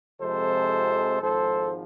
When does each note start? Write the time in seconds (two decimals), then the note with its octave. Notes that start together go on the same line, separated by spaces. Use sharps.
0.21 F2 C3 F3 G#3 A4 C5
1.22 G#1 G#2 F3 A4 C5